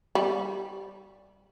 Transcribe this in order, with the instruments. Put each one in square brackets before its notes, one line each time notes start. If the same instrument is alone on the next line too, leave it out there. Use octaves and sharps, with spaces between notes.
[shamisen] G3